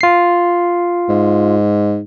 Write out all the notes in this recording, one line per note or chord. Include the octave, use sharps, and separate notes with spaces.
F4 C7
G#2